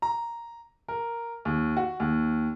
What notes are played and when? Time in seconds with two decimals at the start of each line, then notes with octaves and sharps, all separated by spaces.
0.02 A#5
0.88 A#4
1.45 D#2
1.77 F#4
2.00 D#2